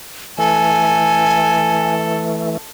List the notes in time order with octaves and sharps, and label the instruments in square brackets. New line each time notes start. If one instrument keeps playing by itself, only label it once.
[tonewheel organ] E3 A3 [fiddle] A4 [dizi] G#5